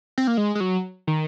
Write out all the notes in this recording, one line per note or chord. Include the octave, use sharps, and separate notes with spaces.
C4
A#3
G#3
G#3
F#3
D#3